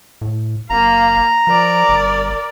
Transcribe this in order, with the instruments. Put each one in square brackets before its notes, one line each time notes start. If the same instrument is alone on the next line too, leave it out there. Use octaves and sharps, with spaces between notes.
[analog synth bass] A2
[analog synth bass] F#1 [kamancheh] A#3 F5 [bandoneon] A#5
[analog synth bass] F3 [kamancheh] A#4 D5
[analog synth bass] G1